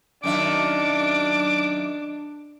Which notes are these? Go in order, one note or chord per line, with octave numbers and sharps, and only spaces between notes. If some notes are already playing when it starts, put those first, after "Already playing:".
F#2 D#3 D4 E5 D6